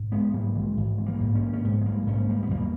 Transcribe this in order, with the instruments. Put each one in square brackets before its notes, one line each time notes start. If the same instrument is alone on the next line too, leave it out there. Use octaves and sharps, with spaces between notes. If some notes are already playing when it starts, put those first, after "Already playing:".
Already playing: [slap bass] G#2
G#3 B3
G#2 G3 A#3
E3 G#3
G#2 E3
G#3
G3 A#3
G#2
A#3 C#4
C#4
G#2 G#3 B3
G#3
G3 A#3
G#2 A#3 C#4
G3 A#3
B3
E2 G3 A#3